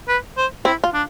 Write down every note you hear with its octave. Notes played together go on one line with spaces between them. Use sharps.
B4
C5
C4 E4
F4
D4